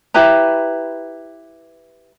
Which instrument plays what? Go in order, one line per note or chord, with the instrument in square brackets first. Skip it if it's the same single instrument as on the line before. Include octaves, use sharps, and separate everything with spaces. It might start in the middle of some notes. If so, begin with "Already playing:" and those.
[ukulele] E4 G4 B4 A#5